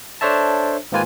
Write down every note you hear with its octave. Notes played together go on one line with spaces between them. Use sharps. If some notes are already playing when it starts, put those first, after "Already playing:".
D4 A4 C5 C#5 E5 A5
G#2 D#3 A#3 F4 B4 G#5